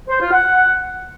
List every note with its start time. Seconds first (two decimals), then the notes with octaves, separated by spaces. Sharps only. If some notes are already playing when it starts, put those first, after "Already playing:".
0.08 C5
0.20 F4
0.32 F#5